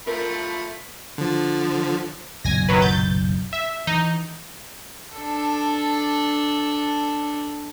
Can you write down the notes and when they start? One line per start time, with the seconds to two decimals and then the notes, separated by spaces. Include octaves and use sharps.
0.07 F3 A3 A#4 B5
1.18 D3 F3
2.44 F#1 B1 A#2 G#5 A#6
2.69 D#3 F#3 B4
2.82 G6 A6
3.53 E5
3.87 E3 D#4
5.17 D4 A4